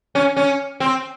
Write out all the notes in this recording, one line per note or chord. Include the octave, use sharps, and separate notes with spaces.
C#4
C#4
C4